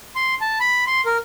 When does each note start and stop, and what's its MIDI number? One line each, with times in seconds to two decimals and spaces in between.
0.16 0.34 84
0.41 0.58 81
0.60 0.84 83
0.87 1.01 84
1.06 1.17 70